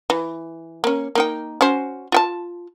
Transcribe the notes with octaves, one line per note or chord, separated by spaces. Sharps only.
E3
A#3 C#4
A#3 D#4 G5
C#4 F#4 C5
F4 G5 A5